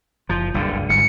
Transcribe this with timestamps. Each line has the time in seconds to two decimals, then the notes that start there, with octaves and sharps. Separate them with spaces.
0.29 F#1 F3
0.54 F#1 C#2 G2 D3
0.89 G1 G#2 C#7